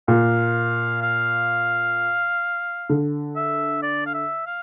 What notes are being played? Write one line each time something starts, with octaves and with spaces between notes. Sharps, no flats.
A#2 F5
F5
D3
E5
D5
F5
E5
F5